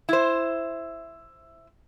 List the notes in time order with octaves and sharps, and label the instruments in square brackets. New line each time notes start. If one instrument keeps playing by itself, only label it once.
[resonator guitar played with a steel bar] E4 C5